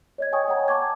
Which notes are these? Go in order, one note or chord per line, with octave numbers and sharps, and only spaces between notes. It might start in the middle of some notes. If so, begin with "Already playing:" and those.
C#5 D#5 G#6
D#5 G5 G#5 C#6 D#6
C#5 D#5 F#5 A#5
A5 C#6 D6 G#6